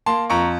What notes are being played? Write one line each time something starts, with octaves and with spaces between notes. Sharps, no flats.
A#3 A5 C6
F2 A#5 C#6